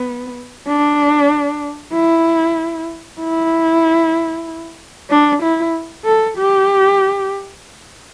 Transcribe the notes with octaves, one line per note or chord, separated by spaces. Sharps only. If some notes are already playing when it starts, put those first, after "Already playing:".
Already playing: B3
D4
E4
E4
D4
E4
A4
G4